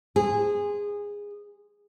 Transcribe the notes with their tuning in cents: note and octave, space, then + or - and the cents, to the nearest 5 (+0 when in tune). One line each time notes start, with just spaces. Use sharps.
G#4 -20 C5 +0